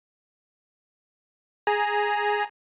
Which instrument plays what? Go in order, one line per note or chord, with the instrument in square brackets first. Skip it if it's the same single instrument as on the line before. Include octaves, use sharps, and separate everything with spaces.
[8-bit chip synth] G#4 G#5 A#5